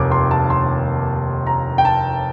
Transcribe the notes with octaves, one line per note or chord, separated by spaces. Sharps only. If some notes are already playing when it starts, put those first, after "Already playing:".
Already playing: F1 D#2 D6
C6
A5
C6
A#5
G5
A5